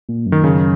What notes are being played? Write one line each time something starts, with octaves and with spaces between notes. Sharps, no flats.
A#2
F#2
D#3
C#3